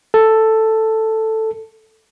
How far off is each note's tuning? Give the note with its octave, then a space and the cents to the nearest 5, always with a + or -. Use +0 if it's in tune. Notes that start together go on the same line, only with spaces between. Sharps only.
A4 +5